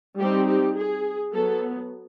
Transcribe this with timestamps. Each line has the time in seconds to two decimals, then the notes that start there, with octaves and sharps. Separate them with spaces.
0.19 G3 C4 D#4 G4
0.48 G4
0.76 G#4
1.33 F#3 B3 A4